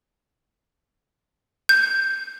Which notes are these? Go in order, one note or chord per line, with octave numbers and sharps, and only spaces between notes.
G6